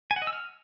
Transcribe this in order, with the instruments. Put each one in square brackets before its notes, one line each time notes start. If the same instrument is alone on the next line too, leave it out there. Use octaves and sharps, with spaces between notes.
[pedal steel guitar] G#5
F#5
D#5
E6
F6